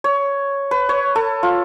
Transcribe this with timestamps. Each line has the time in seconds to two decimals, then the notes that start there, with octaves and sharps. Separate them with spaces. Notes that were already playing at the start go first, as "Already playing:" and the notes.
0.04 C#5
0.71 B4
0.89 C#5
1.16 A4
1.43 F4